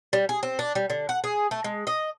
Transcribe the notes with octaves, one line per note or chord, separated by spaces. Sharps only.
G3
G#4
C4
D4
G3
D3
F#5
G#4
A3
G#3
D#5